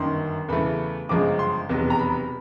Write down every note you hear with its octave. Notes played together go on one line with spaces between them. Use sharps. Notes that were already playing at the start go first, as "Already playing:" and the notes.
Already playing: G1 F#2 D#3 C6
E2 C#3 E3 A3 B5
G1 F#2 C#3 F3 G#3 D6
C6
F1 E2 B2 F#3
A#5
B5